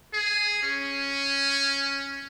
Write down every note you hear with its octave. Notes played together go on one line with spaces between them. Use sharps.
G#4
C#4